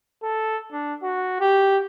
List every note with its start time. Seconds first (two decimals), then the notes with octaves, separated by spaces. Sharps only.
0.23 A4
0.72 D4
1.03 F#4
1.40 G4